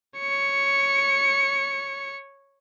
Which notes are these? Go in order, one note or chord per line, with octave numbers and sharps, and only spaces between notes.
C#5 C#7